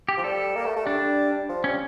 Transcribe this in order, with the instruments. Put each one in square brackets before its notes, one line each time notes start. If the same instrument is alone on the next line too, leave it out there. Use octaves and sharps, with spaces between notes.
[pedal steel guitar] G4
[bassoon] F3
[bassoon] G3 [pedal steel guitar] A4
[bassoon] A#3
A3
A3
[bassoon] G3 [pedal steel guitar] D4
[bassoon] F3
[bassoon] G3 [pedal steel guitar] C#4